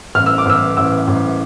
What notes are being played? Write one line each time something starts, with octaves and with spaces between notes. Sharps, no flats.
A1 F6
E6
D6
A1 E6
A1 E6
A1